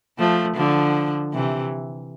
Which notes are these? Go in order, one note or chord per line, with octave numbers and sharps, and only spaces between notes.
F3 A3
D3 F3
C3 E3